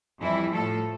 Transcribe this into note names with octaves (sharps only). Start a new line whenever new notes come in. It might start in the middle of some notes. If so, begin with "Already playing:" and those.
F2 E3 G3 E4
A2 F3 A3 A4